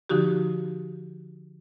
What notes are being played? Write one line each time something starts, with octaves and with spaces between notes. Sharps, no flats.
D3 F3 D#4 F#4 G4